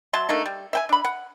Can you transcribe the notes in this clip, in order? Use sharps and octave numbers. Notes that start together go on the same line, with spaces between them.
F#3 E5 A5 C6
A3 A#3 D4 D#4
G3
E5 G5 G#5
D4 B5
F#5